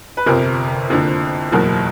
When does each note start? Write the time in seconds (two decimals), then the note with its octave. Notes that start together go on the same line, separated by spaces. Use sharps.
0.17 B4
0.26 G1 F2 C3 A#4
0.90 F#1 F2 D3
1.52 F#1 E2 B2 F#3 A#4